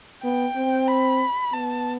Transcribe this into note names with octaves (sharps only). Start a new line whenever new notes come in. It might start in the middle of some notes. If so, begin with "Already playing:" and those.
B3 G5
C4
B5
B3 A5